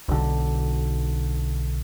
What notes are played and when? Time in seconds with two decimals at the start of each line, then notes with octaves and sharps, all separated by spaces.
0.08 B1 D3